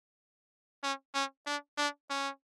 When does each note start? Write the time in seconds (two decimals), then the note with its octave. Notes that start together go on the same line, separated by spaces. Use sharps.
0.83 C#4
1.14 C#4
1.47 D4
1.78 D4
2.10 C#4